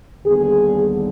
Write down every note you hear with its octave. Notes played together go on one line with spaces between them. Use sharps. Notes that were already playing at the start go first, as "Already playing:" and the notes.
D#2 D3 G3 B3 G#4